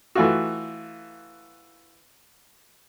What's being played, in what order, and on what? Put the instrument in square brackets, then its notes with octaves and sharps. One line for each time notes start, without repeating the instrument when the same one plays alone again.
[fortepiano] E3 A3 F4 F#4